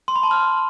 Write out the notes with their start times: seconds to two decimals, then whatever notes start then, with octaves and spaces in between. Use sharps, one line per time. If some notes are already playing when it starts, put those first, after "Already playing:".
0.08 C6
0.16 B5
0.23 A5
0.31 F6